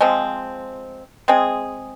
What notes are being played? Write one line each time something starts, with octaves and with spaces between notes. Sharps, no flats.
F3 G#3 C4
G#3 C4 G#4